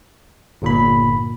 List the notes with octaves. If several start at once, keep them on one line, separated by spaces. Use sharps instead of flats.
G1 A#2 B5